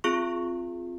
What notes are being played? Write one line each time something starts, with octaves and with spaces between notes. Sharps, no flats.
C4 F4 G#4 C#6